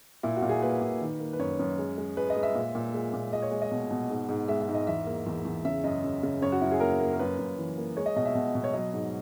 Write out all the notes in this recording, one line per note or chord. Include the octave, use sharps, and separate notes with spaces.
A#2 E4
F#4
A#2
G#4
A#3 B4
A#2
D#3
A#3
B4
F#2 C#5
F#2
G#3
G#3
G#3 B4
D#5
G#3
E5
A#2
A#2
G#3
A#2
G#3 D#5
C#5
G#3
D#5
B2
B2
G#2
G#2
G#3 E5
E5
G#2
D#5
E2 E5
A#3
E2
E2
C#3 E5
F#2 D#5
F#2
C#3
F#2 C#5
F#4
F#2 E4
G#4
A#3 A#4
A#3
A#4
F#2 B4
F#2
E3
A#3
G#3 C#5
D#5
B2 D#5
E5
B2
B2
C#5
F#3 D#5
G#2